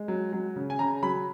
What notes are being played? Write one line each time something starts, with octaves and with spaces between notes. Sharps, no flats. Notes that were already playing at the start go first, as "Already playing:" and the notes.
Already playing: G#3
F#3
F#3
C#3
G#5
C#3 A#5
F#3 B5